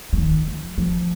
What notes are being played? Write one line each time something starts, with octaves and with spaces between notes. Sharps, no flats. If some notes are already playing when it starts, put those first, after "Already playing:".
F3
D#3
F3
F3